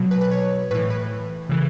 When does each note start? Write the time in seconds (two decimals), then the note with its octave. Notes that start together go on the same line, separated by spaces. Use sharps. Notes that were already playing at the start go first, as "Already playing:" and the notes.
Already playing: B2 F#3
0.11 B4
0.21 B4
0.31 C#5
0.71 A2 B4
0.75 E3
0.90 B4
1.49 C#3 E3